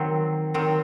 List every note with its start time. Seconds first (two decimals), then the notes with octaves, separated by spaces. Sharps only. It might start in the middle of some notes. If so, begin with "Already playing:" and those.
Already playing: D#3 F#3 C4
0.54 D#3 F#3 C4